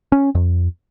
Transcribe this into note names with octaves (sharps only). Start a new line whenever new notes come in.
C#4
F2